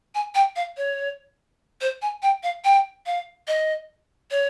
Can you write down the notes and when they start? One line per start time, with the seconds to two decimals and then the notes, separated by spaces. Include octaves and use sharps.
0.15 G#5
0.35 G5
0.56 F5
0.77 C#5
1.81 C5
2.02 G#5
2.22 G5
2.43 F5
2.64 G5
3.06 F5
3.47 D#5
4.31 C#5